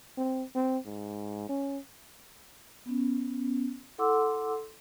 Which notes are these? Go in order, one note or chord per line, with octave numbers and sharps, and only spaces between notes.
C4
C4
G#2
C#4
B3 C#4
E4 A4 F#5 C6 D6 E6